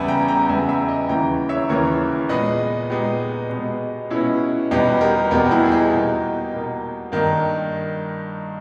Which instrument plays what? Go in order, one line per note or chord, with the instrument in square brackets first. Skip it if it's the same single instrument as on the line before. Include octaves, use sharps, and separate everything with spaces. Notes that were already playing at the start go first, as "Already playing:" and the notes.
Already playing: [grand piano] E2 C#3 G3 B3 E5 G#5
G5 A#5
G5 A#5
E2 C#3 G3 B3 E5 G#5
E5 G#5
D#5 G5
D#2 C#3 E3 G5 A#5
C#5 E5
D#2 C#3 E3 A#4 C#5
A#2 G#3 B3 B4 D#5
A#2 G#3 B3 D#4 G4
B2 G#3 B3
B2 G#3 B3 C#4 E4
E2 B2 G3 B3 D#4 G4
G4 A#4
E2 B2 G3 B3 G4 A#4
G4
E4 G#4
G#4
D#4 G4
B2 A#3
B2 A#3
G2 D#3 A#3 D#4